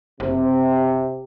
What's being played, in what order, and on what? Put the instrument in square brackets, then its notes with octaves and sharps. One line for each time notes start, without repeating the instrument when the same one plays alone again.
[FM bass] F#1 [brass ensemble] C3